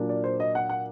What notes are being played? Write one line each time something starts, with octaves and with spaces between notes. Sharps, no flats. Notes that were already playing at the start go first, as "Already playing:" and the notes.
Already playing: A#2 F#3 A#3 D4
D5
C5
D#5
F#5
F#5